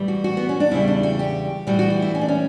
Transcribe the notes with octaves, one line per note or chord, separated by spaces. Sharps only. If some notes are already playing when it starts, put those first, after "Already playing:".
Already playing: A2 E3 G3
F#4
F#4
B3
C#4
D4
E2 C#3 G3 E4
D4
F#4
G4
A2 E3 G3 F#4
F#4
F#4
E4
C#4
D4
C#4